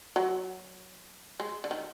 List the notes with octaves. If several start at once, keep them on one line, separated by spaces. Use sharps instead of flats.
F#3
G#3
D3
D#3